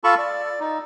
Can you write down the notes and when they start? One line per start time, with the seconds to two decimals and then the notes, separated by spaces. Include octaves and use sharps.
0.04 F4 A4 A5 B5 C#6
0.18 D5
0.60 D#4